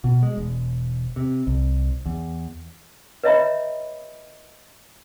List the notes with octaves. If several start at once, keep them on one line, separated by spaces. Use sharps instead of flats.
B2
G#3
E1
C3
C2
E2
B4 C#5 D#5 E5 A#5 B5